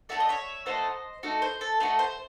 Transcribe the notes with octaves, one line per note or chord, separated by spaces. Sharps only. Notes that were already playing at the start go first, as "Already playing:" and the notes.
A3 D#4 F#4 A4 E5
D#5
C#5 E5
A3 D#4 F#4 A4 C5 D#5
A3 D#4 F#4 A4
C5
A4
A3 D#4 F#4 A4 C5
C5